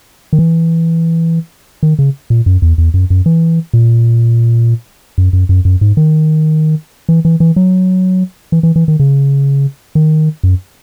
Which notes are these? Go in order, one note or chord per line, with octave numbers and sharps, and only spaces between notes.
D#3
E3
D#3
C#3
A#2
F#2
E2
E2
F#2
F#2
E3
A#2
F#2
F#2
F#2
F#2
G#2
D#3
E3
E3
E3
F#3
E3
E3
E3
D#3
C#3
D#3
F#2